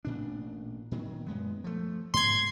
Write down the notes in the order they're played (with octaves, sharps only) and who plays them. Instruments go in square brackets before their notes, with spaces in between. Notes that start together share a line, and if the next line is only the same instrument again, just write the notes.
[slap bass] A1 A#2 D4
A#2 D#3 F#3
F#2 G#3 B3
F3 A3
[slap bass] G#2 [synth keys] C6 G#6